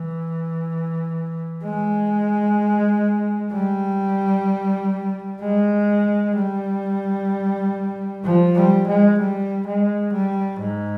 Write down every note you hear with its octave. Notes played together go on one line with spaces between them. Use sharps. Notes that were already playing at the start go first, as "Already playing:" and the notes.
Already playing: E3
G#3
G3
G#3
G3
F3
G3
G#3
G3
G#3
G3
G#2